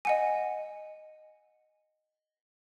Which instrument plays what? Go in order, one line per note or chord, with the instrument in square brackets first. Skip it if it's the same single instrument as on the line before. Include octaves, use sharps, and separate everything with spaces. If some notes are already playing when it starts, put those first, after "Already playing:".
[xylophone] D#5 F#5 G#5